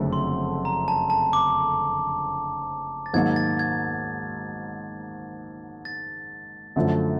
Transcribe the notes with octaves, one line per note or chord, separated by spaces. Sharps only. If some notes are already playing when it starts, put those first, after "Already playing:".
Already playing: F#1 F2 D3 A3
C6
A#5
A5
A5
D6
A6
G#2 D#3 F#3 A#3 G#6
A6
G#6
A6
F#2 D3 F3 A3